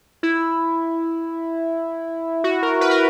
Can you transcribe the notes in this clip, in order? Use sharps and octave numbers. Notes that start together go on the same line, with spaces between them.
E4
F#4
A#4
B4
A#4